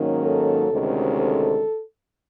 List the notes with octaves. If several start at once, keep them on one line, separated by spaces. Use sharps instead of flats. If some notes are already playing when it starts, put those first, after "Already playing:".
Already playing: G#2 D#3 F#3 A#3 C#4
A4
D2 C3 D#3 G#3 C#4
A4